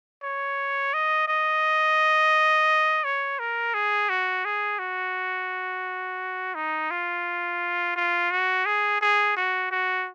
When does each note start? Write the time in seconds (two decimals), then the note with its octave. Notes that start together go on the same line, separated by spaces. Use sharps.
0.23 C#5
0.94 D#5
1.28 D#5
3.04 C#5
3.39 A#4
3.74 G#4
4.09 F#4
4.45 G#4
4.79 F#4
6.55 D#4
6.91 F4
7.96 F4
8.31 F#4
8.66 G#4
9.01 G#4
9.37 F#4
9.71 F#4